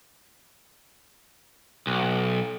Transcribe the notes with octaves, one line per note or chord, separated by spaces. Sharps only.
B1